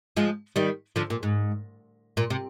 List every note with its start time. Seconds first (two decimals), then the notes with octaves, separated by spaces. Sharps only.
0.17 F3 G#3
0.56 D#3 G3
0.96 D3 F3
1.10 A#2
1.23 G#2
2.17 A#2
2.30 C3